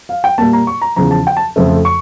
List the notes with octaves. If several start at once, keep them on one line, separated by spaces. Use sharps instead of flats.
F5
G5
A#2 G3 A#3 A5
A#5
C#6
A#5
E2 C#3 F3 A#5
A5
G5
A5
F2 C#3 F3 A3
C#6